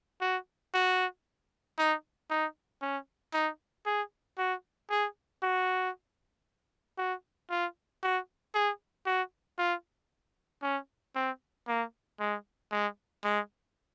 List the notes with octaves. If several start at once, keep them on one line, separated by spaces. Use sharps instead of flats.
F#4
F#4
D#4
D#4
C#4
D#4
G#4
F#4
G#4
F#4
F#4
F4
F#4
G#4
F#4
F4
C#4
C4
A#3
G#3
G#3
G#3